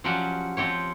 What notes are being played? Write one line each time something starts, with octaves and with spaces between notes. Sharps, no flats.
F3 F#3 C#4 F#4 G4 D5
F3 C4 G4 C#5